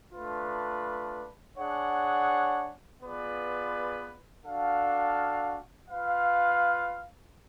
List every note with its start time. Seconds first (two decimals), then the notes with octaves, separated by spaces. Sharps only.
0.12 A3 D4 F4 B4
1.57 D4 G#4 C#5 F#5
3.01 B3 F4 G#4 B4 D5
4.44 D4 F#4 A4 F5
5.89 F4 B4 F5